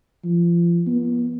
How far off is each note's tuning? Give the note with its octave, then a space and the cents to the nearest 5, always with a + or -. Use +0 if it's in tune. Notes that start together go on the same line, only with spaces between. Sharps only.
F3 -30
B3 -40